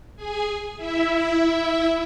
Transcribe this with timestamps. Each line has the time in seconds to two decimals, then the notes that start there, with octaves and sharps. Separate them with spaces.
0.16 G#4 G#5
0.77 E4 E5